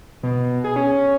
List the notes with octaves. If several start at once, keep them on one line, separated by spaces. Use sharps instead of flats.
B2
G#4
C#4